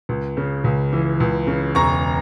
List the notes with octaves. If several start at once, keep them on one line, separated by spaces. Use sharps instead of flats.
C#2
C#3
C#2
E3
C#2
C#3
E1 A#5 C#6